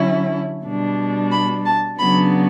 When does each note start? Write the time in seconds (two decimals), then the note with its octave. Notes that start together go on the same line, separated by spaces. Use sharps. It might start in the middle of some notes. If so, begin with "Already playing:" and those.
Already playing: D3 F#3 C#4 E4
0.64 B2 G3 D4
1.32 B5
1.65 A5
1.99 C#3 F#3 B3 D4 B5